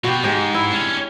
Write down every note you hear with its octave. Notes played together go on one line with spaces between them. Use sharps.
B2 F#4 G4
G#2 G#3 G4 D#5
E4
C#4 D4